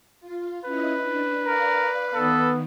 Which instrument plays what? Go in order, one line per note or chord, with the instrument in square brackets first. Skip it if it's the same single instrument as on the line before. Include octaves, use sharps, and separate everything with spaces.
[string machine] F4
[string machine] C#4 E4 D#5 [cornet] B4
[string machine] D4
[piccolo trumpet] A#4 [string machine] D5 F5
[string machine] D#3 [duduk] B3 [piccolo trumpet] A4